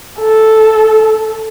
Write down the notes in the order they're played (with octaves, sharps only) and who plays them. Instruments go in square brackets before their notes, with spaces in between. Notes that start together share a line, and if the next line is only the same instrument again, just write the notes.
[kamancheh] A4